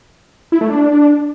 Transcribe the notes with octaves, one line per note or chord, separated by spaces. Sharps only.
E4
A3
D4